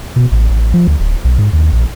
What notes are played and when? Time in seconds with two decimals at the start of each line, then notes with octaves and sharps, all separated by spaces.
0.16 B2
0.32 A1
0.50 A1
0.74 F3
0.87 D2
0.99 D1
1.24 B1
1.38 G#2
1.53 D#2
1.73 A#1